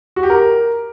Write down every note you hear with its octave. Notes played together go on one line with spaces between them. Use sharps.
F#4
G4
A#4